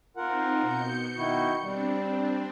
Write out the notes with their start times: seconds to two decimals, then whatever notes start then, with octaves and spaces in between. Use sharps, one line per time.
0.17 C4 D#4 F4 A#4 F#5
0.61 B2 G6 C#7
1.17 D#3 E4 F#4
1.62 G3 C4 D4